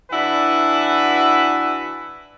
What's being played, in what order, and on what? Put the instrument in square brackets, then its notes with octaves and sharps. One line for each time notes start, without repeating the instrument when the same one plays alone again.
[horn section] E3 D4 E4 F#4 B4